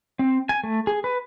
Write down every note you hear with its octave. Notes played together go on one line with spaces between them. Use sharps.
C4
G#5
A3
G#4
B4